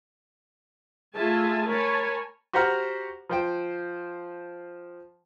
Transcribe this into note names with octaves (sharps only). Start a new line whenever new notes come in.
A3 F4 G#4 E5 G#5 A5
A#4 C#5 G#5 A5 B5
F#4 G4 C5 F#5 A#5 F6
F3 C5 G5